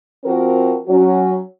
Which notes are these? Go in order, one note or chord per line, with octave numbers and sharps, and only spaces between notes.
F3 C4 F#4 A#4
F#3 C#4 F#4